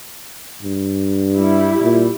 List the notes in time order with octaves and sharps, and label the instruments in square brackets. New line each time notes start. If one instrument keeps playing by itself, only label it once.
[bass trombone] G2
[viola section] G3 E4
[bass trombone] A#2